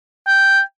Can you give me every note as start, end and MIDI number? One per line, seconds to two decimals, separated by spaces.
0.27 0.60 79